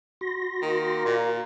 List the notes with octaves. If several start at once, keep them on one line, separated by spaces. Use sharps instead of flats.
F#4 C6 A#6
D#3 A#3
A#2